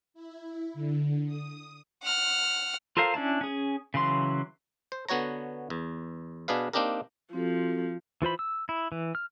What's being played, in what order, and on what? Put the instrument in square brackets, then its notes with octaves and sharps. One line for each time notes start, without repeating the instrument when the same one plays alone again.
[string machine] E4
D3
D#6
[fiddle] F#5 F6
[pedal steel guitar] F4 A4 A#4 C5 F5
C#4 D4 E4 A5
C#4 G#4
C#3 E3 F#3 C6
[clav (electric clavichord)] C5
D3 B3 F#4 C#5 A#5
E2
B2 D4 G#4 B4 F5
A#3 C4 D4 D#4 G4 A#4
[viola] F3 [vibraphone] C4 F#4 A4
[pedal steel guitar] E3 F4 C5 B5
E6
E4
E3
F6